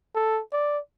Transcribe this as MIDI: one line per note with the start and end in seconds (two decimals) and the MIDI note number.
0.15 0.42 69
0.53 0.79 74